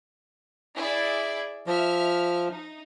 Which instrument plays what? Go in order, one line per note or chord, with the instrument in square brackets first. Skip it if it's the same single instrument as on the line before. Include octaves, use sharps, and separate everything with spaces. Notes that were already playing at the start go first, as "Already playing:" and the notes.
[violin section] E4 G#4 D5
[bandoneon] F3 [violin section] E5 F6
[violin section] D#4